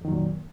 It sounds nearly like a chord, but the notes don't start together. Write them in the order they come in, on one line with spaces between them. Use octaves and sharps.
F2 D#3 F#3 A#2